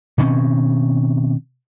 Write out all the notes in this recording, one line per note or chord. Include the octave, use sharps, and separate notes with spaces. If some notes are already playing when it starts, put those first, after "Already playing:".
B2 D#3 C4 C#4